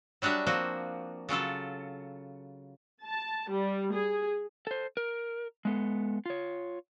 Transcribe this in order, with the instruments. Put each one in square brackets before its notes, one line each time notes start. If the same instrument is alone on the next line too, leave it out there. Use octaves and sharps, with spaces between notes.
[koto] F#3 G3 D4 F#4 E5
F3 A#3 C4 F#4
C#3 F#3 F4 A4
[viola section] A5
G3
G#4
[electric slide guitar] A4 C5
A#4
G#3 B3 A4
F4 C#5